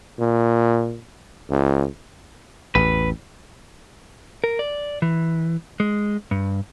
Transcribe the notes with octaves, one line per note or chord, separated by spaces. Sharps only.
A#2
C#2
A1 E2 B4
A#4
D5
E3
G#3
G2